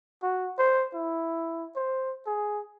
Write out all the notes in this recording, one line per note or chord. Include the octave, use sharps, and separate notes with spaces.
F#4
C5
E4
C5
G#4